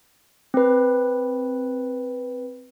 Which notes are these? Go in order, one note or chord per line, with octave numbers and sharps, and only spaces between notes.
C4 B4